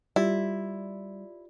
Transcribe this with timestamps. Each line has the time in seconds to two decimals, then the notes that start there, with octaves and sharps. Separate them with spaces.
0.16 G3 E4 F4 G4 D5